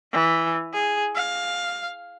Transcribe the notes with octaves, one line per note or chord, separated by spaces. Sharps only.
E3
G#4
F5